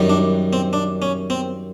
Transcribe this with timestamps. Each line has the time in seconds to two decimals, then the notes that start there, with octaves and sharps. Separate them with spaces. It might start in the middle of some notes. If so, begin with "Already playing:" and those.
Already playing: F#2 D#3 G3
0.10 D4
0.53 C4
0.73 D4
1.02 C#4
1.30 C4